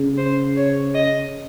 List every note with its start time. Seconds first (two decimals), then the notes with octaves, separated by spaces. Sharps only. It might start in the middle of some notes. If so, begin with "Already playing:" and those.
Already playing: C#3
0.18 C5
0.56 C#5
0.94 D#5